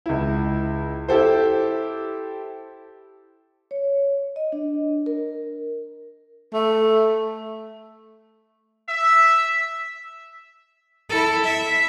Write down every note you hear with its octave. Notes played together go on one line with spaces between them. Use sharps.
C#2 E4
E4 G4 A4 C5
C#5
D#5
D4
A#4
A3
E5
E4 A4
E5